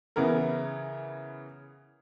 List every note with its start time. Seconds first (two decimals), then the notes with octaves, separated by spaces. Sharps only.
0.16 C#3 E3 B3 A#4